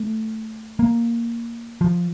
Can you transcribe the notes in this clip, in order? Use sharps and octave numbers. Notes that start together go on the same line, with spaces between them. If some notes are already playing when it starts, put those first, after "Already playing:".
Already playing: A3
A#3
F3